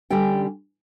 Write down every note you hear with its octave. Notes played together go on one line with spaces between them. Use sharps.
D3 G3 C#4 G5